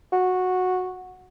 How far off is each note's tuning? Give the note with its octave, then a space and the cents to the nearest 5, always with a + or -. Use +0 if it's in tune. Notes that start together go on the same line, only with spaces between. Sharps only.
F#4 -10